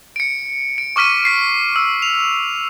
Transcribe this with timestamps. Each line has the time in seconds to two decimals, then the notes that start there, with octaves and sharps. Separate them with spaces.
0.16 C#7 D7
0.78 D7
0.96 C#6 D6 F6 B6 D#7
1.25 B6 C7
1.76 E6
2.02 F7